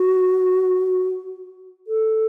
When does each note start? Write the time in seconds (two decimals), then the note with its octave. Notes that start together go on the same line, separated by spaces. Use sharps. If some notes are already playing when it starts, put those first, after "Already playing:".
Already playing: F#4
1.87 A4